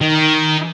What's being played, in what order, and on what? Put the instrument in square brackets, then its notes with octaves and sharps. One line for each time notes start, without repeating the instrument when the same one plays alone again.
[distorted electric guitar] D#3